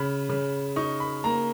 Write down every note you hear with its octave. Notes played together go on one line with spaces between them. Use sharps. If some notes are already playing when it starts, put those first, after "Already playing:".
Already playing: C#3 B5
C#3
D#4 C#6
B5
A#3 A#5